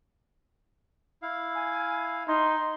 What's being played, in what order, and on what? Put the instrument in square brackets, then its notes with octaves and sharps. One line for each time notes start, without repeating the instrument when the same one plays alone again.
[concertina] E4 F5
[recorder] G#5
[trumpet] D#4 [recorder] C6